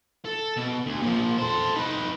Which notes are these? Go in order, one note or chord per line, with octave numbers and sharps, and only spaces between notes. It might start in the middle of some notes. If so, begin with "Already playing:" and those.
A4
B2
D2
A#2 F3
A4 C5
D#4 B4